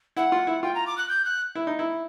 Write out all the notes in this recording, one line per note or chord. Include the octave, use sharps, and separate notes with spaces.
E4 F#5
F4
E4
F4 G5
A#5
D6
F#6
G6
F#6
E4
D#4
E4